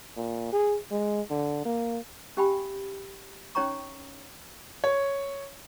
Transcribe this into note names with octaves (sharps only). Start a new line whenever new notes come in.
A#2
G#4
G#3
D3
A#3
C#4 G4 F5 G5 G#5 B5
C#4 D#4 C#5 G5 A#5 C#6
C#5